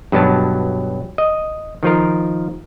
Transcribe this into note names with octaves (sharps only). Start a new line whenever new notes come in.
G2 B2 F#3 A5
D#5
D#3 F3 F4 A#4